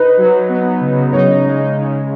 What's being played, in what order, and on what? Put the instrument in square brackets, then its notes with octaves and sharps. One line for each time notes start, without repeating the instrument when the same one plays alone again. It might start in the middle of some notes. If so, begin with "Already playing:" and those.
Already playing: [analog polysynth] D#4 [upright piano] B4
[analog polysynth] F#3
B3
C#3
[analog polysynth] D#4 [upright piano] C#5
[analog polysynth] G#3
C#3